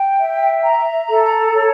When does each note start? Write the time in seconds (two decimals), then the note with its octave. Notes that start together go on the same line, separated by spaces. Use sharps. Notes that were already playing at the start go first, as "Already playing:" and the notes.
Already playing: G5
0.18 E5
0.63 A#5
1.09 A4
1.54 C#5